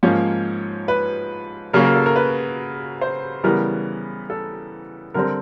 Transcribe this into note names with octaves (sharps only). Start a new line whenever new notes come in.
G#2 F3 A#3 C#4 C#5
B4
C#3 F#3 A#3 C#4 A#4
A#4
A4
A#4
B4
C5
C#3 E3 G3 B3 A#4
A4
D3 G3 C4 A#4